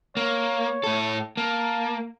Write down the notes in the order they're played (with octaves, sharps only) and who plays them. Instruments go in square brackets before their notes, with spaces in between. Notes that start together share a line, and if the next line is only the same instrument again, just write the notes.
[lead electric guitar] A#3 [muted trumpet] C#5
[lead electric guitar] A2 A4
[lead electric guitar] A#3 [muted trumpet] A5